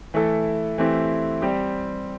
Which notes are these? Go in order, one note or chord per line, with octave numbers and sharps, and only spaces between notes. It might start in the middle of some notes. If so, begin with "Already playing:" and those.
E3 A3 E4 A4
E3 A3 C4 E4 G4
G3 C4 G4